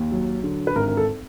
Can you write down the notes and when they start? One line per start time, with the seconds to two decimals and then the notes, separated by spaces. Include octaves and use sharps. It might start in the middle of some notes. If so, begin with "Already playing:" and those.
Already playing: D#2
0.11 F#3
0.43 D3
0.67 B4
0.75 G#1 A#4
0.88 A#4
0.97 A4